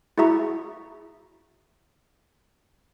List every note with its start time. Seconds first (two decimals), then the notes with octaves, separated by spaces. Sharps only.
0.18 E4 F#4 G#4 E5 A#5 C#6